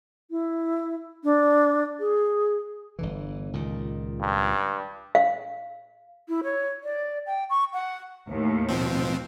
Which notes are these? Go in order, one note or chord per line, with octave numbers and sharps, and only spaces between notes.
E4
D4
G#4
G1 D3 E3
C#2 A#2 D#3
G2
F5
E4
C#5
D5
G5
C#6
F#5
D#2 A2
B2 F3 C4